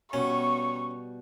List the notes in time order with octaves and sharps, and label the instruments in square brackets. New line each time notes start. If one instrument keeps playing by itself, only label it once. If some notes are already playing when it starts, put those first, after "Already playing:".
[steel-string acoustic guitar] B2 G3 [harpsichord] C#4 [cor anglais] C#5 [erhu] C#6